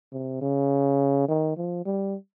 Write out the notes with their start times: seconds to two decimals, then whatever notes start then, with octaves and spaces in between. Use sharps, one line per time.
0.13 C3
0.42 C#3
1.28 D#3
1.57 F3
1.86 G3